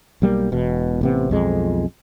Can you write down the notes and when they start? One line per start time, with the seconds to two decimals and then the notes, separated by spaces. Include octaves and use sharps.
0.22 B1 G3 A#3
0.52 E1 B2
1.01 A1 C3 B3
1.30 B1 F2 G#3